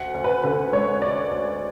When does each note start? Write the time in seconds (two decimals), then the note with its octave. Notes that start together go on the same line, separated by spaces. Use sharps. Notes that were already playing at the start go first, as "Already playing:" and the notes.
Already playing: D2 F#5
0.14 D2
0.24 B4
0.44 D3 B4
0.73 G#3 C#5
1.01 D2 D5
1.31 D2